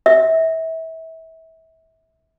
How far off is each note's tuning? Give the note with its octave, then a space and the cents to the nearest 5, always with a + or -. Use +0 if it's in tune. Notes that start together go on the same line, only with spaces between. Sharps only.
E5 -30